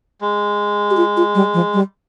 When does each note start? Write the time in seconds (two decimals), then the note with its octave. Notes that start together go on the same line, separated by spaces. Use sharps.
0.21 G#3
0.90 G4
0.97 F4
1.17 F4
1.35 G3
1.54 F3
1.74 G3